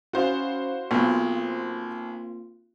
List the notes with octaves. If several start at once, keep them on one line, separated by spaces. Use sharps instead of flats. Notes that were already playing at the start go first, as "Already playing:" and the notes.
C#4 E4 F#4 C5 F5
B1 A#3 C4 F4